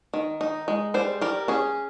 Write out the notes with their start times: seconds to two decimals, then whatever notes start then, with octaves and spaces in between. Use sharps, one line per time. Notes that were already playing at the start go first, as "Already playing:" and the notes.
0.14 D#3
0.41 D#4
0.68 G#3
0.94 G3 C5
1.21 G3 A#4
1.48 C#4 G#4